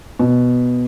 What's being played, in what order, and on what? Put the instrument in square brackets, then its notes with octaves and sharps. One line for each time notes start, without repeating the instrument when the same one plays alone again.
[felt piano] B2